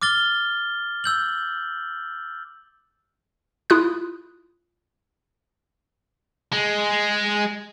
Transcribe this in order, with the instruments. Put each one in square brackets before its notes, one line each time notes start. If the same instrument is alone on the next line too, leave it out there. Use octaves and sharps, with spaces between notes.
[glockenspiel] D6 F6 A6 G7
E6 G6 F#7
[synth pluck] E4 F4 D#6 F#6
[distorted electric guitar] G#3